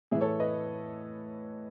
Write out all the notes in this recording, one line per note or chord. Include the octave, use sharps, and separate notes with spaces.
A2 E3 E4 G#4
A4 C#5
B4 D#5